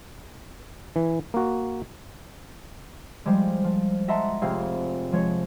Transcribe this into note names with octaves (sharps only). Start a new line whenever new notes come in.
E3
A#3 F#4
F3 G3 G#3
F3
D#5 E5 F#5 A5 A#5 C6
F1 C3 G#4 F5
F3 G#3 C#5